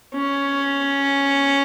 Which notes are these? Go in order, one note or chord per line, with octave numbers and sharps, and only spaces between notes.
C#4